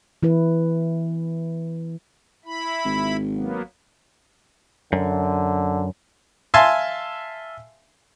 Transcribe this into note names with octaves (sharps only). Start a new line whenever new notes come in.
E3 E4 B4
E4 B5
G#1
F#3 A#3 B3
F#2 D3
E5 F5 G#5 A5 C6